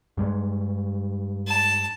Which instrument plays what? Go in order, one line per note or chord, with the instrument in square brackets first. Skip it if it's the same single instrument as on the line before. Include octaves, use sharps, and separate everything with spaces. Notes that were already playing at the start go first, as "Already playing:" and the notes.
[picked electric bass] G2 G3 G#3
[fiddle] A5